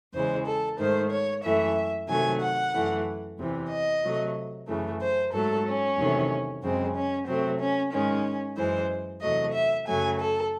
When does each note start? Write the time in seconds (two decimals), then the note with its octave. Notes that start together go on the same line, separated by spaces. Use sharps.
0.14 E2 C#3 E3 G#3 C5
0.46 A4
0.78 G#2 D#3 A3 C5
1.11 C#5
1.43 F#2 E3 A3 E5
2.08 C3 D#3 F#3 A3 G#5
2.40 F#5
2.74 F#2 E3 A3
3.38 E2 C3 E3
3.70 D#5
4.03 C3 F#3 A3
4.67 F#2 C#3 E3 A3
5.00 C5
5.33 G#2 F#3 A3 A4
5.65 C#4
5.97 E2 C3 D#3 F#3 A3
6.62 F#2 C#3 G#3 C4
6.95 C#4
7.27 C3 F#3 A3 C4
7.59 C#4
7.92 G#2 D#3 G#3 C#4
8.57 F#2 E3 G#3 C5
9.21 E2 C3 F#3 A3 D#5
9.53 E5
9.87 F#2 C#3 F#3 A3 G#5
10.19 A4